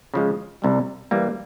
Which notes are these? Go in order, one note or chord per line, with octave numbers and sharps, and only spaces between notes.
C#3 F3 G#3
C2 C3 G3
E3 G3 A#3